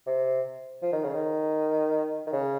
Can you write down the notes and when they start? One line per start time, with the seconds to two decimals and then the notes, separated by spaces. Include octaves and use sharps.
0.06 C3
0.82 F3
0.92 D#3
1.03 C#3
1.13 D#3
2.27 D#3
2.33 C#3